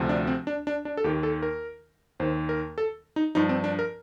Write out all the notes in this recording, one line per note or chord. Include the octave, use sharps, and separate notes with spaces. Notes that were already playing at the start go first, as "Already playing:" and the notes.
Already playing: D2 C3 F3
D4
C4
D4
D4
D4
A4
D#2 D#3 G4
A4
A#4
D#2 D#3 C5
A#4
A4
D#4
G2 F3 D#4
C4
D4
A#4